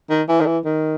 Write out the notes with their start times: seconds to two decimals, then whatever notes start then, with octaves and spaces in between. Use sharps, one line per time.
0.10 D#3
0.28 E3
0.40 D#3
0.46 E3
0.64 D#3